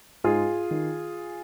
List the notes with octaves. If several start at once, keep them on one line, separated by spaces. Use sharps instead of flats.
G#2 F4 G#4
D#3